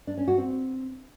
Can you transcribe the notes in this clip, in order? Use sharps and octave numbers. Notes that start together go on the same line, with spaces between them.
D4
C#4
F#4
C4